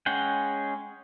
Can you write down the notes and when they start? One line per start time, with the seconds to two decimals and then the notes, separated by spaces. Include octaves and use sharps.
0.06 G#3 C#4 G#4 F#5 G5